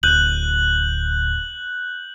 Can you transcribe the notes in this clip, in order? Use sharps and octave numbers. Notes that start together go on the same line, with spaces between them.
D1 F#6 G6 F#7